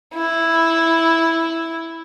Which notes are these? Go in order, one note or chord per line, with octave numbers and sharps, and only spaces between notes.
E4